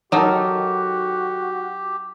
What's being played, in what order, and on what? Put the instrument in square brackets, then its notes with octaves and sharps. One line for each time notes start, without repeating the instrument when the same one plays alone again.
[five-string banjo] D#3 A4 A#4 [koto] F#3 D#4 [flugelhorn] F#4 [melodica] G4